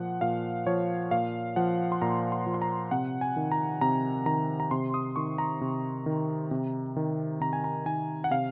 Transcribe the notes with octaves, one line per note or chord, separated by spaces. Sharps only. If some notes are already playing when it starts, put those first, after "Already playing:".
Already playing: A#2 F3 F#5
A#2 F5
F3 C#5
A#2 F5
F3 F#5
C6
A#2 A#5
C6
F3
C6
A#5
C3 F#5
G#5
D#3
A#5
C3 A#5
D#3 A#5
A#5
C3 C6
D#6
D#3 C#6
A#5
C3
D#3
C3
D#3
C3 A#5
G#5
A#5
D#3 G#5
F#5
C3 F5